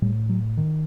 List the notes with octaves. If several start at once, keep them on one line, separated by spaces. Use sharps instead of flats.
A2 G3
F#3
D#3